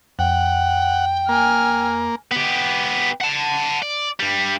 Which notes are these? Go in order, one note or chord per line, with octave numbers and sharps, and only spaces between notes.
F2 F#5 G5
A#3 G#5 F6
B3 G4
F#5 A5
D5
G2 G3